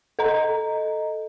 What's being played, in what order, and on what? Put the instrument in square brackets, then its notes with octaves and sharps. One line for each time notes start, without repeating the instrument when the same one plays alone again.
[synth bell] A4 D#5 A#5